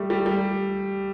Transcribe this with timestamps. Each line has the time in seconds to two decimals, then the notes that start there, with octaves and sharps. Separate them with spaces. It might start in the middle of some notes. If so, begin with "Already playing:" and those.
Already playing: G3 A3
0.10 G3
0.26 G3